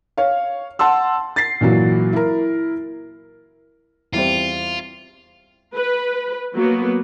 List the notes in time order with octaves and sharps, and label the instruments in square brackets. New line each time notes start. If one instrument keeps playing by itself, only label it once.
[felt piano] C#5 F5
F#5 A5 C6 E6
A6 C7
A#2 E3 F#3
E4 A#4
[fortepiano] E2 G3 C4 [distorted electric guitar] F4
[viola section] B4
F#3 A#3 B3